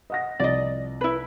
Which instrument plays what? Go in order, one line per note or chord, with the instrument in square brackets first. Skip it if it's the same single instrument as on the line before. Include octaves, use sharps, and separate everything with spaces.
[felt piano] D#5 F#5 A#6
[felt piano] C2 F3 [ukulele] D5 D#5
[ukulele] E4 B4